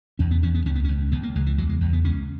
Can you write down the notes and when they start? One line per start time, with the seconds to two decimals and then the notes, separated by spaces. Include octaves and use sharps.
0.19 E2 C#4
0.31 B3
0.43 E2 C#4
0.55 B3
0.66 C#2 C#4
0.75 B3
0.84 C#4
0.89 C#2
1.12 C#2 B3
1.23 A#3
1.36 C#2 G#3
1.46 E3
1.58 E2 F#3
1.69 G#3
1.81 E2
1.93 B3
2.04 C#2 C#4